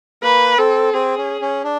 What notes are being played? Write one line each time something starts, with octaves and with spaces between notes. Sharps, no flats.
A#3 B4
C4 A4
C4 G#4
C#4
C#4
D4